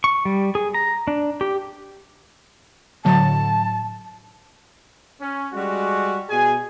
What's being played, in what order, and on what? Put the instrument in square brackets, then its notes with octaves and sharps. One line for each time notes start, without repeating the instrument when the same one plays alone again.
[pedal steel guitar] C#6
G3
G#4
A#5
D4
G4
[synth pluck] A2 D3 F#3 [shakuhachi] A5
[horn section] C#4
G3 G#3 F#4
B2 G#4 G#5